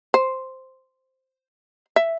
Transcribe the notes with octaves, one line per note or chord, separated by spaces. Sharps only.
C5
E5